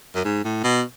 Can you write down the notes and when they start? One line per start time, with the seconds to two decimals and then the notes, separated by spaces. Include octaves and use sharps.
0.15 F#2
0.24 G#2
0.44 A2
0.64 B2